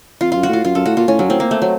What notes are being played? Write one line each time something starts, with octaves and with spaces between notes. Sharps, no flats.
F2 F4
F#2 F4
F#4
A2 F4
F#2 F4
F#2 A4
A2 F#4
A#2 F4
A2 C#4
F#2 F#3
A2 C4
A#3
A3
F#3